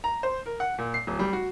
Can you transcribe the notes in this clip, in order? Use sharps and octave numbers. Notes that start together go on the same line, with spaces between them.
A#5
C5
A#4
F#5
A#2
C7
D1
G3
F#4